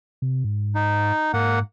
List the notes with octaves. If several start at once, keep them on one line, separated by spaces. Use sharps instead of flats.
C3
G#2
D#4
G#2 A#3 F#5